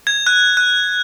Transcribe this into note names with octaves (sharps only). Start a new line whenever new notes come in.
G#6
F#6
F#6